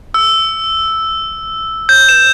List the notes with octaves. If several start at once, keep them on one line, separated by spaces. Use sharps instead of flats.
E6
G6
E7